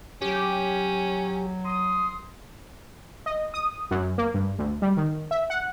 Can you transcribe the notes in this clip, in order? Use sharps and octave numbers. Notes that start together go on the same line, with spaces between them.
F#3 C#4 G4
C6 D#6
D#5
D#6
F#2
A#3
G2
D2
G3
D#3
E5
F#5